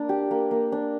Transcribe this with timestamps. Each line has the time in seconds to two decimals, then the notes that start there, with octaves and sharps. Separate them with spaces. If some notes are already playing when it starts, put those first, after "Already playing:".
Already playing: A#3 D4
0.09 G4
0.31 A#3
0.51 A#3
0.72 D4